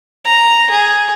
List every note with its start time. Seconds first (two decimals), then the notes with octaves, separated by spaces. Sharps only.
0.25 A#5
0.70 G#4